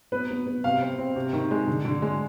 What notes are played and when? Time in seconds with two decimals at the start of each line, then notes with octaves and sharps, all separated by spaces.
0.12 B3 B4
0.30 B3
0.46 B3
0.64 C3 F5
0.81 C4
0.98 C4
1.16 C3
1.33 D#3
1.51 G#3
1.67 D3
1.85 D3
2.02 G#3